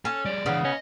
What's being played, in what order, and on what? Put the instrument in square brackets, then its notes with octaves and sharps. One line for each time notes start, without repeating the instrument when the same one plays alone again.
[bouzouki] C#4 [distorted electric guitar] A4
[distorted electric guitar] G3 G#4 [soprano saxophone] D5
[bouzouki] C#3 B3 [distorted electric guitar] E3 D4
[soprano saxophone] C#4 [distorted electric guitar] D#5